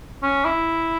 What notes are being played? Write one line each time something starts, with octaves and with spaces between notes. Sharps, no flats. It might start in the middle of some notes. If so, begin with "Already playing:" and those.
C#4
E4